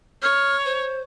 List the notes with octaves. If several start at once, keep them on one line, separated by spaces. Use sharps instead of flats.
C#5 F6
C5